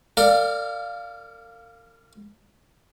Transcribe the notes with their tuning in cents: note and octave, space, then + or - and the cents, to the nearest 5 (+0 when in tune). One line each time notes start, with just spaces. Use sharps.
A#4 -40 D5 +10 F5 +0